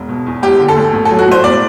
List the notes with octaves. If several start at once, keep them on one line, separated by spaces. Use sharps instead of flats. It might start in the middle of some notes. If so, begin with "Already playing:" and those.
Already playing: E1
B2
E2
E1 G4
D3
A4
D2
A1
A4
F#3
F#4
A2 C5
E1 D5